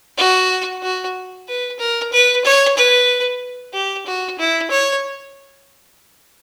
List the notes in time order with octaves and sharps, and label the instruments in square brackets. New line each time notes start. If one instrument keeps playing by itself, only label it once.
[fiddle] F#4
F#4
B4
A#4
B4
C#5
B4
G4
F#4
E4
C#5